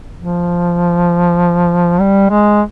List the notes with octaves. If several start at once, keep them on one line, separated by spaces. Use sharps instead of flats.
F3
G3
G#3